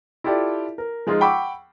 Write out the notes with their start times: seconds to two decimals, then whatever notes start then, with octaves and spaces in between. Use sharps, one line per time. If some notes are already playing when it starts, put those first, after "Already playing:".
0.24 E4 F4 G4 A4 D5
0.78 A#4
1.07 F3 G#3 D#4 F4 G#4
1.20 F#5 G5 B5 C#6 D6 E6